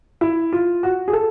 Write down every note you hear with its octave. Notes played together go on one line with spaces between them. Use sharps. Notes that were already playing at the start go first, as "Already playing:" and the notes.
E4
F4
F#4
G#4
A4